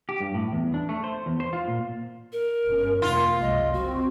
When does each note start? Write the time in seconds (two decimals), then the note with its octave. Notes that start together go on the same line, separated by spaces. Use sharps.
0.09 G4
0.20 G2
0.34 A2
0.52 E2
0.74 D4
0.89 A3
1.04 C5
1.26 E2
1.40 C5
1.53 F4
1.68 A#2
2.33 A#4
2.66 G1 C#4
3.02 F2 C3 A#3 F4
3.41 F#1 C2 G#3 D#5
3.73 C4 F#4